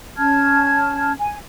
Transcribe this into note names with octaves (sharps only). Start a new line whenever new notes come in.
C#4 A5 F6 G#6
G#5